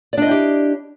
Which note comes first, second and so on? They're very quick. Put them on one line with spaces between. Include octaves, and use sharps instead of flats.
D5 D4 D#5 E4 G4